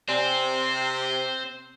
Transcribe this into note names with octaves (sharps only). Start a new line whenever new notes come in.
C3 C4 C5 D5 G#5